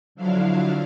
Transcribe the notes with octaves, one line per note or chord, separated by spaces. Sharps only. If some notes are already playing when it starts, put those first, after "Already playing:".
D3 F3 F#3 D4 E4 F5